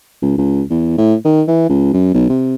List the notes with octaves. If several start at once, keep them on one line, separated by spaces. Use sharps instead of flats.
C#2
C#2
E2
A2
D#3
E3
C#2
F#2
B1
C3